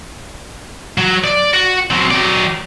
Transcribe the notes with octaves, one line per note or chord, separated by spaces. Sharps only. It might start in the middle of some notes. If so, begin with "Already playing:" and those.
F#3
D5
F#4
F#3 C4
F#3 D5